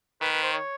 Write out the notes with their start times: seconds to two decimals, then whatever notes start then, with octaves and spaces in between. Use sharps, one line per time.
0.21 D#3 B4
0.32 B4
0.43 C5
0.53 C#5